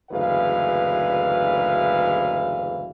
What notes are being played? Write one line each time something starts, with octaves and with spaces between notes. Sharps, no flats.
F#1 D2 G#2 E3 B4 F5